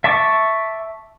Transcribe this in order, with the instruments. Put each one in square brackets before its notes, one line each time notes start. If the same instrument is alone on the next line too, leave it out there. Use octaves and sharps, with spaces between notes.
[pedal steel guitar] E5 A5 C#6 D6